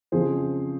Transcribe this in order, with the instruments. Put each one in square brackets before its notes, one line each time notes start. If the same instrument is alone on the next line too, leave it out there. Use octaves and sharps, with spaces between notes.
[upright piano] F2 C#3 F3 G#4 C5